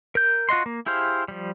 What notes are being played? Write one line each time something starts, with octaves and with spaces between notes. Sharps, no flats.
A#4 G6
F4 F#4 D#5 C6
A#3
E4 G4 G#4 C5 F5
F3 G3